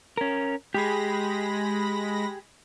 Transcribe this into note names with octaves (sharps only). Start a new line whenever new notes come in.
C#4 A#4
G#3 G4 G#4 B5 A#6